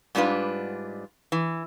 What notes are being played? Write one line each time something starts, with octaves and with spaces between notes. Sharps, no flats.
G#2 G3 D4 F4 B4
E3